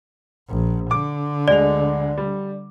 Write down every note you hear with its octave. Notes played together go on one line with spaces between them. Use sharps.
A#1
D3 D6
D2 G#3 D5 F7
G3